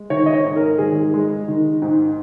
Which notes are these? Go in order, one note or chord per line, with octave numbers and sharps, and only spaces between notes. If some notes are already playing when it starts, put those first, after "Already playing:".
Already playing: G#3
D#3 C#5
D#5
C#5
G#2
A#4
G#1 G#4
G#3
D#3
G#2